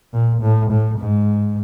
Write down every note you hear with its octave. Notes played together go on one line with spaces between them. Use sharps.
A#2
A2
A2
G#2